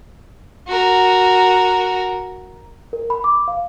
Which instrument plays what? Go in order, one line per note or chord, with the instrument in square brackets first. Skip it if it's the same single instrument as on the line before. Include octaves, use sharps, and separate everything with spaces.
[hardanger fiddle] F#4 A#4
[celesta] A#4
B5
D6
F5